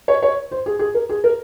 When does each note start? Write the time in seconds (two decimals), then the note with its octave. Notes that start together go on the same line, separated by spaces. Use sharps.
0.08 C#5
0.22 C#5
0.51 C5
0.66 G#4
0.79 G#4
0.95 A#4
1.09 G#4
1.24 A#4